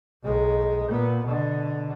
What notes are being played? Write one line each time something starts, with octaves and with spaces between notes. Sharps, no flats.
B1 G#3
A#2 B3
B2 D3